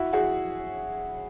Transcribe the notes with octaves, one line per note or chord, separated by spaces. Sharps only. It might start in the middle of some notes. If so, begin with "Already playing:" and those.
Already playing: E4 F#4
F#4 G#4